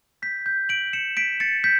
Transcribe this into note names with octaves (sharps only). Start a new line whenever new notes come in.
G6 B6
G6
D7 F#7
C#7 E7
B6 D7
A6 C#7
G6 B6